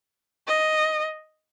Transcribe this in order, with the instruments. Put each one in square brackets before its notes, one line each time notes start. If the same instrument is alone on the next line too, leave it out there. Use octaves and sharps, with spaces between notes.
[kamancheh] D#5